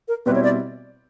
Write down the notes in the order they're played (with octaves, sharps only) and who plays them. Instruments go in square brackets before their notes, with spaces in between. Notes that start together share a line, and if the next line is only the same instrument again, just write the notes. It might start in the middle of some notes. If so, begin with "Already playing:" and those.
[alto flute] A#4
[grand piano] B2 G3 C4 E4 G4 [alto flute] B4
[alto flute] C#5
D5